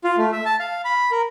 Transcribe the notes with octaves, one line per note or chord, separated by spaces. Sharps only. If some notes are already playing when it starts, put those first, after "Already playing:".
F4
A3
E5
A5
F5
B5
A#4